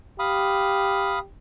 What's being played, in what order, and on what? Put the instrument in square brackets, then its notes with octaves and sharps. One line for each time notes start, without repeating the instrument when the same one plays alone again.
[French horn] G4 [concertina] F5 B5 D#6